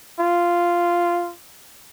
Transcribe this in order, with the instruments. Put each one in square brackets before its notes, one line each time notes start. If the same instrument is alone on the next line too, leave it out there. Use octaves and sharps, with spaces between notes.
[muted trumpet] F4